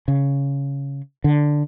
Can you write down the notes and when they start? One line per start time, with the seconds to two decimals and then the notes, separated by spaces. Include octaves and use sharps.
0.08 C#3
1.24 D3